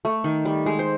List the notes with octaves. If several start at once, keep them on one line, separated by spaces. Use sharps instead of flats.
A3
D#3
G3
G#3
C5